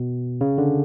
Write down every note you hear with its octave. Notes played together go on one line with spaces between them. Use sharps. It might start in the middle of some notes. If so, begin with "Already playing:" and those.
Already playing: B2
C#3
D3